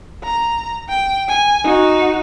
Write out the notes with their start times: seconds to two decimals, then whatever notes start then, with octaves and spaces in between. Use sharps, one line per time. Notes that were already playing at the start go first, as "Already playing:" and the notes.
0.24 A#5
0.89 G5
1.29 G#5
1.64 D#4 F#4